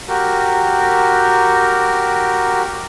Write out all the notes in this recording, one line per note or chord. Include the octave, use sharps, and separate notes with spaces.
F#4 G4 A#4